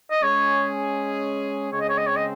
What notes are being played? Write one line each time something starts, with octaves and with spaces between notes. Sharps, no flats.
D#5
G#3 C#4 G#4 C#5
C#3 G#3 C4 C#5
D#5
C#5
D#5
C#5
D#5